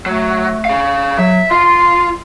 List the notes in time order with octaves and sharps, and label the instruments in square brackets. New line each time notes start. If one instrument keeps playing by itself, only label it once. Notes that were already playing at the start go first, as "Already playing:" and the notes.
[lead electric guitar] F#3 [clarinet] A3
[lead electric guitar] G#4 F5
[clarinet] F#3 [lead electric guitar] E5
[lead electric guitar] F4 [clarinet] C6